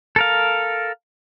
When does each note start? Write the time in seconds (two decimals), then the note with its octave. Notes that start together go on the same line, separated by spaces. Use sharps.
0.16 A4 A#4 F5